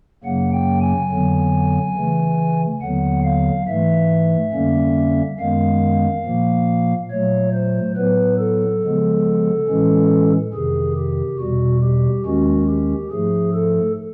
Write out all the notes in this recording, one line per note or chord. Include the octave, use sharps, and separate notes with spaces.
F#2 C#3 F#3 A#3 F#5
G5
G#5
F2 D3 F#3 B3
C#3 E3 A3
D#2 D3 F#3 B3 F#5
F5
G#2 E3 A3 E5
F2 D3 G3 A#3 C#4
F#2 D#3 G#3 B3 F5
A#2 F3 A#3
A#2 F#3 A3 C#5
C5
A2 F#3 B3 B4
A4
C#3 F3 G#3 B3
A2 E3 G#3 C#4
F2 C3 D#3 G#4
G4
E2 B2 G3 F#4
G4
D#2 D#3 G#3 C#4 F#4
G4
G#2 F3 A3 G#4
A4